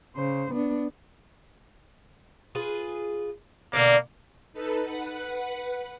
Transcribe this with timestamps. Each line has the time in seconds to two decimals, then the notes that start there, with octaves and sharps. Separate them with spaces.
0.16 C#3 C5
0.52 B3 D4
2.55 F4 G#4 B4
3.73 B2 D3 A#3 D5
4.53 D#4 A4 B4
4.84 B4 F#5